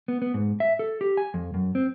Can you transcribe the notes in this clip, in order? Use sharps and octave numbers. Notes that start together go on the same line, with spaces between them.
B3
B3
G#2
E5
A4
G4
G#5
F2
F#2
C4